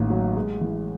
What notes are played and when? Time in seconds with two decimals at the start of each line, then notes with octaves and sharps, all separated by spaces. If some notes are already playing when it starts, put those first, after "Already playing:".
Already playing: A1 D#3 A#3
0.10 F#3
0.36 G#3
0.61 E3